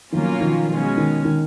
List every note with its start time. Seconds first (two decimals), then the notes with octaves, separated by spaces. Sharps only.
0.12 B2 D#3 F3 F#3 A#3 C#4 F4
0.41 D#3 F3
0.69 B2 G#3 C#4
0.97 D#3
1.25 D#3